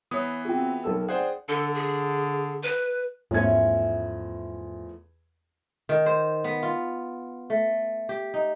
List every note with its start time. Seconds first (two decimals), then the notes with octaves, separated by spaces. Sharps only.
0.11 E3 B3 C#5 D#6
0.45 C4 F4 F#4 G#4 G5
0.84 B1 A4 A#4 E6
1.08 G#4 C5 D5 F#5 G5
1.49 D3 A4
1.75 G#4
2.63 B4
3.31 E2 G#2 F3 A3 C#4 G#6
5.89 D#3
6.06 C5
6.44 B3
6.63 F4
7.50 A3
8.09 G4
8.34 D#4